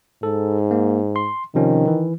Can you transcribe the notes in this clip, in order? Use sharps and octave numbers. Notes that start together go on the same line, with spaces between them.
G#2 A4
A#3
C6
C3 D#3 F3 C#4
E3